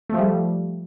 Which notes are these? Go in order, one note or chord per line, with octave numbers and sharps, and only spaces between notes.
F3 G3 A3